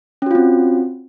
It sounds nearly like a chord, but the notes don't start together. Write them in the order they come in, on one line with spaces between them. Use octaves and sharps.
C#4 F#4 F4 C4